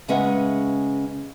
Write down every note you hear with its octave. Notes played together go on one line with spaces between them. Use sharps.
C#3 G#3 C#4 B4 E5 F#5